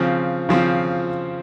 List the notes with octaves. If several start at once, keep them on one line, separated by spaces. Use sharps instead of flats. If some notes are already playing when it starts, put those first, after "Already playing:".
Already playing: C#3 F3 C4
C#3 F3 C4